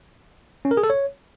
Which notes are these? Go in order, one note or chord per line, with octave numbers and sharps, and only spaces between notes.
C#4
A#4
G#4
A4
C#5